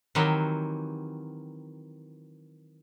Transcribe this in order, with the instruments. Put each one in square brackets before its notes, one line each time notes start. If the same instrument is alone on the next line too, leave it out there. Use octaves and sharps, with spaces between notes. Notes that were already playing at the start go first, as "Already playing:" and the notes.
[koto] D#3 E3 F#3 C4 F#4 G4